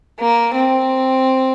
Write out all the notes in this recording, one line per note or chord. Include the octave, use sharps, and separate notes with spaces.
A#3
C4